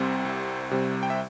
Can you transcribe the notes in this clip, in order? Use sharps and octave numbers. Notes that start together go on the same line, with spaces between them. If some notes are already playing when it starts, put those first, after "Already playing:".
Already playing: C2 C3 G3 C4 C5
C2
C3 G3 C4
G5
E5